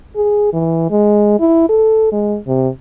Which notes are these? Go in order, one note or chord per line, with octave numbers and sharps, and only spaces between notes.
G#4
E3
G#3
E4
A4
G#3
C3